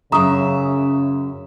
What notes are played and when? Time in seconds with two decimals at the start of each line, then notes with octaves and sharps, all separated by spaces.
0.12 F#2 C#3 E5 A#5 C#6 D#6